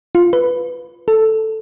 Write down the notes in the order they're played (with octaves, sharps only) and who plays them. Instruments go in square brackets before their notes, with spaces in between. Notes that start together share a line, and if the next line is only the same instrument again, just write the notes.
[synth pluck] F4
B4
A4